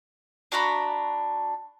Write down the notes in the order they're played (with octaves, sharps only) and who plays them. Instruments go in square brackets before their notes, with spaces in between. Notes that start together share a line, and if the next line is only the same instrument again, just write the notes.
[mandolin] D4 F#4 A#5 B5